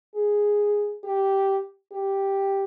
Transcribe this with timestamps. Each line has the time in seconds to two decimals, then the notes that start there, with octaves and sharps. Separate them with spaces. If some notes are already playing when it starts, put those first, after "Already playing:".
0.15 G#4
1.04 G4
1.93 G4